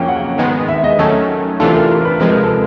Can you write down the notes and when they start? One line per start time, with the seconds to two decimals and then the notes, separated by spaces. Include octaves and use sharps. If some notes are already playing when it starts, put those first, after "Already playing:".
Already playing: F2 C#3 F#3 A#3 C#4 G5
0.08 F#5
0.38 G#2 D#3 G#3 B3
0.68 E5
0.84 D#5
0.99 D#3 F#3 A3 C#4 A4
1.60 C3 E3 A3 D4 F4 A4
1.75 A#4
1.90 A#4
2.01 A#4
2.05 B4
2.20 C3 F3 G#3 B4
2.32 A#4
2.44 A4